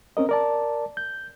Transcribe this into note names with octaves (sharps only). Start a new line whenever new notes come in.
C4 C#4 A#4 D#5
A#4 D5 A5
G6